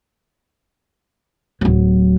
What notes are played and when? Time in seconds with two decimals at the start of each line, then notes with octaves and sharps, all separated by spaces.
1.61 D1 F#3